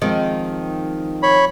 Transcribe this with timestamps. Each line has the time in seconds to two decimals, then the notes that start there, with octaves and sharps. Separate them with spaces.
0.02 D#3 F3 G#3 C4
1.23 C#5 B5